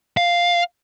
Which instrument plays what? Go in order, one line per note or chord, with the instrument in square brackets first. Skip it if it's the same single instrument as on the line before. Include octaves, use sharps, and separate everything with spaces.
[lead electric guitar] F5